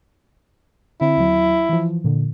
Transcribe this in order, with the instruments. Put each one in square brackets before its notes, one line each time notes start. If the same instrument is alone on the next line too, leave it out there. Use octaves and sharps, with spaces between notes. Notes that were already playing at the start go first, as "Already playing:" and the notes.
[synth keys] D3 C4 [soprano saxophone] E4
[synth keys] D#2 F#3
E3 F3
A#2 D3